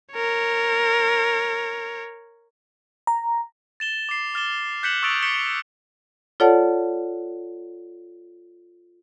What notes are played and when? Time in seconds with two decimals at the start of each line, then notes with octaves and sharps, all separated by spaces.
0.13 A#4 C#5
3.07 A#5
3.80 A6 E7 G7
4.09 D6 C7
4.34 D6 F6 A6 E7 G7
4.83 F#6 G6 B6 C#7 E7 F#7
5.03 C#6 D#6 E6 A6 D7 F7
5.23 C#6 G6 B6 C#7 G7
6.40 F4 A4 C#5 D5 F#5 A5